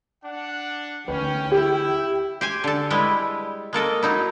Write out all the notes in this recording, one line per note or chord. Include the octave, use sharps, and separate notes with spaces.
D4 F#5
D2 C#4 B4 G5
E4 G4
G4 C5 G#5
D3 A4
G3 G#3 E4 G4 B4
G#3 A#3 A4 D#5
F#3 D#4 E4